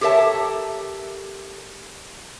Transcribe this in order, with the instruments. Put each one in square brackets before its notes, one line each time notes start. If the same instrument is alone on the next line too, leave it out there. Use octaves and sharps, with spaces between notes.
[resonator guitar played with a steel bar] G4 A4 A#4 C#5 E5 A5